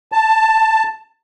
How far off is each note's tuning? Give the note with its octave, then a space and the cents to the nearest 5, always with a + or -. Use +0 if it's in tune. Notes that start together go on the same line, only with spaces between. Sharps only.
A5 +10